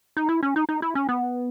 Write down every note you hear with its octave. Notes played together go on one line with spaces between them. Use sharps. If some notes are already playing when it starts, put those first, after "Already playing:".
D#4
E4
C#4
D#4
D#4
E4
C#4
B3